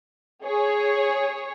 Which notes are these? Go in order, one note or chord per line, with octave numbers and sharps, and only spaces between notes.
G#4 C#5